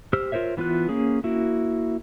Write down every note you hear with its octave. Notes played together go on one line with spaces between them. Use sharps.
G4 C5 E6 F6
F4 A#4 C5 C#5 E5
E3 B3 F4 B4 F#6
A#3 C#4 G#4
A#3 E4 F#4